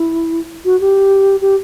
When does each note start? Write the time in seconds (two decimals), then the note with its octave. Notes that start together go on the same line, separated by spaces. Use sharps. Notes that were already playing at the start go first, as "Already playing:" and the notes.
Already playing: E4
0.65 F#4
0.81 G4
1.42 G4